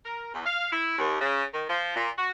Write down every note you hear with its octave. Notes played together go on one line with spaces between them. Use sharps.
A#4
E2
F5
E4
D#2
C#3
D#3
F3
A#2
F#4